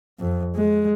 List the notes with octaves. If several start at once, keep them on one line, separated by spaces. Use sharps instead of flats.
F2
G#3